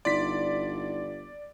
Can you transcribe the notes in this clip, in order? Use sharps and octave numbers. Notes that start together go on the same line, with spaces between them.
G1 D#4 E4 D5 C6 B6